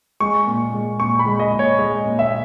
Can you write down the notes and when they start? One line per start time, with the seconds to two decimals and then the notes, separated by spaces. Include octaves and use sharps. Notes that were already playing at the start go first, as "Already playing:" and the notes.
0.20 G#3 C#6
0.47 A#2
0.74 G#3
1.00 A#2 C#6
1.19 B5
1.26 G#3
1.40 D#5
1.53 A#2
1.59 C#5
1.78 G#3 D#5
2.05 A#2
2.19 E5